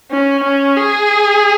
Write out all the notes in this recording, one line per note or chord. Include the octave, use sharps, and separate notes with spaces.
C#4
C#4
G#4